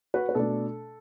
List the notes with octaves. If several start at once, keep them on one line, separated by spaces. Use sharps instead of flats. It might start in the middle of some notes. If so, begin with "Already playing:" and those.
F#4 B4
B4
B2 A3 D4 A4